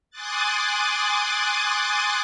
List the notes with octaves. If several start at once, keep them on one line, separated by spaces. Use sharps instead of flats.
G#5 C6 D6 D#6 F#6 A6